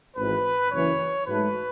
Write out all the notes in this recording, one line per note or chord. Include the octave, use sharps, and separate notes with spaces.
G#1 G#2 E3 B4
F#1 F#2 E3 C#5
G#2 F#3 A3 B4